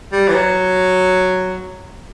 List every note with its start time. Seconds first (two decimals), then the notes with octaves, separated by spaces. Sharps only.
0.12 G3
0.28 E3
0.34 F#3